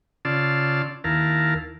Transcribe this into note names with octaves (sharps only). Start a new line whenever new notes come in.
C#3 F4 D5 A5 C6 E6
D#2 E4 A#4 F5 A5